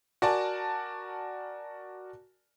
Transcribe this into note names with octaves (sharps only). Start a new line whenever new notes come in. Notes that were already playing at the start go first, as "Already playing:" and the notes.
F#4 A#4 D5 G#5 A5